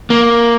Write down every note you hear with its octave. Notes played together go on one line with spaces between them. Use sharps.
A#3